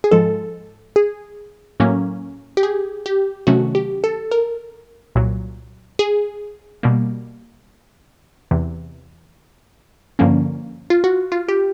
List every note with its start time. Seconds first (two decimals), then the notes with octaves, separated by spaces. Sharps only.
0.04 G#4
0.11 G#2 F3 G#3 A4
0.96 G#4
1.80 A2 F#3 A#3 C#4
2.57 G4
2.63 G#4
3.06 G4
3.47 C3 D#3 F#3 A3 C#4 F#4
3.75 G4
4.04 A4
4.31 A#4
5.15 C2 A#2 F#3
5.99 G#4
6.83 B2 G3 A#3
8.51 E2 C3 E3
10.19 G2 D3 F3 A#3 C#4
10.90 F4
11.04 F#4
11.32 F4
11.48 G4